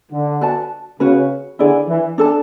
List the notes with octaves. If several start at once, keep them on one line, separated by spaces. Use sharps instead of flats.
D3
F#4 B4 D5 A5
C#3 C#4 F#4 B4
D3 E4 G#4 D5
E3
D4 A4 D5 A5